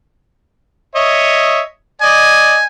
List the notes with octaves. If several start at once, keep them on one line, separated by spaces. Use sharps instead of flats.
C#5 D#5 E5
D5 D#5 G#5